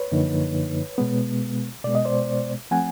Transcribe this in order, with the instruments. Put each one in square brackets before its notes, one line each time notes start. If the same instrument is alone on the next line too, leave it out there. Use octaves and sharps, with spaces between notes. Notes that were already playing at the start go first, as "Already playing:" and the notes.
Already playing: [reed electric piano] B4 C#5
F#2 D3 F3 A#3 D#4
B2 G#3 B3
B2 G#3 B3 D5
D#5
C5 D5
F3 A3 C4 F#5 G#5